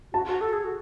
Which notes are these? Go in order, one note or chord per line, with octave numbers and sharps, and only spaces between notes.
F#4 A5
F#4
A4
G#4
F#4